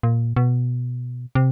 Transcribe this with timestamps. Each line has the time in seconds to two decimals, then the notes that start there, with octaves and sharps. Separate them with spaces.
0.03 A#2
0.36 B2
1.35 C3